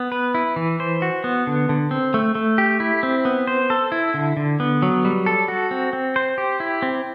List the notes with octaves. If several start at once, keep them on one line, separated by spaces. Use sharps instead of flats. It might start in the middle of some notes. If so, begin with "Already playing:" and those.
Already playing: B3
B4
E4
E3
C5
F#4
B3
D3
D3
C4
A3
A3
G4
E4
C4
B3
C5
A4
E4
D3
D3
B3
F#3
G3
A4
F#4
C4
C4
C5
G4
E4
C4